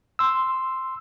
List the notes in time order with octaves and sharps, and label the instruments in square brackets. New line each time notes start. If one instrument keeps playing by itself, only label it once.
[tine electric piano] C6 E6